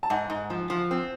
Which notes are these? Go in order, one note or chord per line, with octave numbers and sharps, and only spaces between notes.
A5
G#2 F#5 G#5
G#2
F3
F3
C4